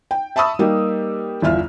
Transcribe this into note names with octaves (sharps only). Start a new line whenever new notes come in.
G5
E5 A5 B5 C#6 D#6 E6
G3 A#3 D#4 G4
G1 E2 F4 E5 F6